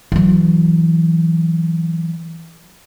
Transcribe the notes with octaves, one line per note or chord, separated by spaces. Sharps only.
E3 F#3